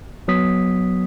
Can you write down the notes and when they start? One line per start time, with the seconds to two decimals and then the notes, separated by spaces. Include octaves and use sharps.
0.28 F#3 B3 D#6 B6